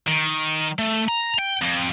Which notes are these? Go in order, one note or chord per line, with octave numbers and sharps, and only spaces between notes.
D#3
A3
A#5
G5
F2